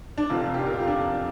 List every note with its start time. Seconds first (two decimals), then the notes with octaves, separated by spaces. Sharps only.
0.18 D4
0.30 F1 F2 C3 F3 F4
0.54 G4
0.59 F4
0.66 A#4
0.73 G4
0.80 F4
0.87 D4